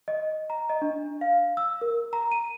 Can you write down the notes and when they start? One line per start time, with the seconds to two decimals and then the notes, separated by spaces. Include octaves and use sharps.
0.08 D#5
0.50 A#5
0.70 D#5
0.82 D4
1.21 F5
1.57 E6
1.82 A#4
2.13 A#5
2.32 D#7